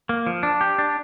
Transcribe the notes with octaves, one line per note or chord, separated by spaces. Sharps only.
A#3
F3
D4
G4
D4